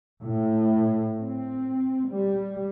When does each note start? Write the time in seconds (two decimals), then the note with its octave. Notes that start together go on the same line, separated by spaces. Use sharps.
0.23 A2
1.18 C4
2.08 G3